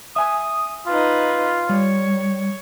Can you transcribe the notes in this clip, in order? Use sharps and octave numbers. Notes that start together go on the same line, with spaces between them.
E5 G#5 D#6
D#4 F4 B4
G3 C#5